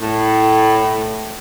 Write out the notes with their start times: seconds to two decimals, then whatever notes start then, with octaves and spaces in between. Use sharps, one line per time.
0.01 A2